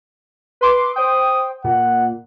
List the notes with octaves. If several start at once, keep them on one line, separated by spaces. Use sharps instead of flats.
B4 C6 D6
C5 G5 D#6
A#2 F#5